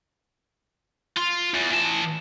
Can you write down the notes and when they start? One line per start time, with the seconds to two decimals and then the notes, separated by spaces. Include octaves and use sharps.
1.17 F4
1.54 E2
1.71 E3 A5